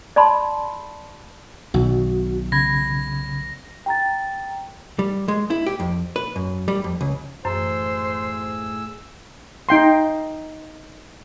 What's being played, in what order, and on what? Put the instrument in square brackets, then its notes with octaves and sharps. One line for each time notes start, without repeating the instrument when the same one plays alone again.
[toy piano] D5 A5 B5 C6
[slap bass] B1 [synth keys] B2 D#3 [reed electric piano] F#4
[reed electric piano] C#3 B5 G#6 [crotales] A#6
[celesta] G5 A#5 A6
[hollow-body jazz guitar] G3
G#3
E4
G4
F2
B4
F#2
G3
F2
C#2
[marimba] F#2 E3 [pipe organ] A2 G#4 E6 [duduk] C5
[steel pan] D#4 G5 C6